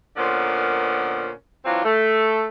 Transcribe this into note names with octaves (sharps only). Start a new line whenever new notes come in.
A#2 D3 B3 C#4 A#4 C5
E3 F#3 C4 D4 F4
A3